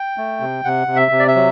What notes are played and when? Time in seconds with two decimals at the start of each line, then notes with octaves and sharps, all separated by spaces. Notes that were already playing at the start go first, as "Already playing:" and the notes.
Already playing: G5
0.17 A3
0.40 C3
0.64 C3 F#5
0.87 C3
0.96 E5
1.12 C3
1.19 D5
1.28 E5
1.36 F#3